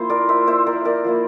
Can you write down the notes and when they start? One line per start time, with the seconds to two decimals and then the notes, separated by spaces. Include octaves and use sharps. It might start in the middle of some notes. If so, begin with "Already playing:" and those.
Already playing: F3 A#3 E4 C5
0.10 A#4 D5
0.29 C5 E5
0.47 C5 E5
0.67 A#4 D5
0.85 A#4 D5
1.05 F3 A#3 E4